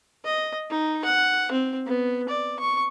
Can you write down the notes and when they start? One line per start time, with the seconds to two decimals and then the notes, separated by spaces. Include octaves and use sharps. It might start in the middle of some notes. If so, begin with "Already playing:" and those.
0.25 D#5
0.70 D#4
1.05 F#5
1.52 C4
1.86 B3
2.29 D5
2.60 C#6